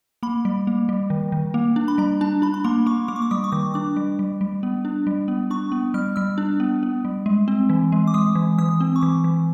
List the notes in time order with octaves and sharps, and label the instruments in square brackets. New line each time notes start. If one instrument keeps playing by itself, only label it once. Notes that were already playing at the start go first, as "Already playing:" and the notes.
[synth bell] A#3 B5
G3
A#3
G3
D#3
D#3
A#3
D4
B5
G3 A#5
D4 A5
D4 B5
B5
A#3 C6
A#3 C#6
A#3 D6
C#6
D6
G3 D#6
C#6
D#3 D6
D4 D6
G3
G3
G3
B3
D4
G3
B3
D4 C#6
B3
G3 F6
G3 E6
D4
B3
B3
G3
G#3
C4
E3
G#3
D6
G#3 D#6
E3
E3 D#6
C4
C#6
E3 D6
E3